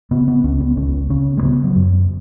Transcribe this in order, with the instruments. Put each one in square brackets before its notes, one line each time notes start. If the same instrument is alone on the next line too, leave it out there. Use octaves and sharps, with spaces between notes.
[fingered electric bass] C#3 B3
B3
C#2 C#4
B3
C#2 C#4
C#3 C#4
G#3
C#3 B3
F#3
F#2